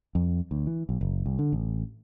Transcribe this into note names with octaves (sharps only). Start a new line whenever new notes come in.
F2
D2
E3
B1
F#1
C2
D3
A1